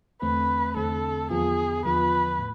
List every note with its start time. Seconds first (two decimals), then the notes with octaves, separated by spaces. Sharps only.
0.22 E2 D3 A3 C4 B4
0.76 E2 D3 A3 C4 A4
1.30 E2 D3 F3 B3 F4 G#4
1.84 E2 D3 F3 B3 F4 B4
2.39 A2